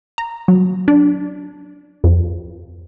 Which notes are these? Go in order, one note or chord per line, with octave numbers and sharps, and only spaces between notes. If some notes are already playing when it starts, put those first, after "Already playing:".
A#5
F#3
D4
F2